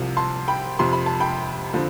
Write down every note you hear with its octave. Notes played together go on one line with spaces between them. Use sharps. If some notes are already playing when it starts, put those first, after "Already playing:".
Already playing: C2 C3 F3
A5 C6
G5 B5
F2 C3 F3 C6
B5
A5
G5 B5
D3 F3 C4